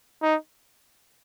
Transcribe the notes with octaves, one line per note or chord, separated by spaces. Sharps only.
D#4